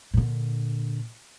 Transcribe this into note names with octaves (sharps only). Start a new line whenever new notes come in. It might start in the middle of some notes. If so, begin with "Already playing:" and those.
A#2 D3